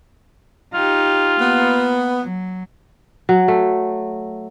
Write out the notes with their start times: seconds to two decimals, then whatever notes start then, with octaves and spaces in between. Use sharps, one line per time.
0.74 D#4 F4 G4
1.41 A#3 B3
2.20 F#3
3.29 F#3
3.48 A3